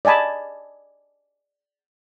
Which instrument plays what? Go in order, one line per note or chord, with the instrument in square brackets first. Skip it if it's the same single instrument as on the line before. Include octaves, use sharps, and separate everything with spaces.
[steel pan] D5 D#5 G#5 A5 B5